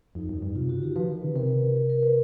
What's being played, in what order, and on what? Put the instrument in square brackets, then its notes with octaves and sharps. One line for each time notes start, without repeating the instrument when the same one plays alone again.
[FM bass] F2 [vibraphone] D#4
[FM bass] F#2
G2
[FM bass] C3 [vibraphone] F4
[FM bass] C#3 [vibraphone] F#4
[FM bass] D#3 [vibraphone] G4
[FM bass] F3 [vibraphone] B4
[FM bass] D#3
C#3
[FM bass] C3 [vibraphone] A#4
[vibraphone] A#4
A#4
B4